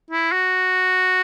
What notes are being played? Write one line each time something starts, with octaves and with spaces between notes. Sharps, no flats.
E4
F#4